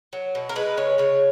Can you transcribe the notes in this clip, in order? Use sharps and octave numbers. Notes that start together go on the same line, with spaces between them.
F#3
B2
A#4
G#3 B4
C#3 C#5
C#3 C#5